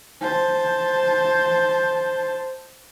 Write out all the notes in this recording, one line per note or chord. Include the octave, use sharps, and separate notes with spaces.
C5 A5